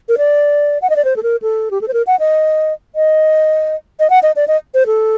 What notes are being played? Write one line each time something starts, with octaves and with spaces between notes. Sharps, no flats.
A#4
D5
F#5
D#5
D5
C5
A4
A#4
A4
G4
A4
C5
A#4
F#5
D#5
D#5
D#5
F#5
D#5
D5
D#5
C5
A4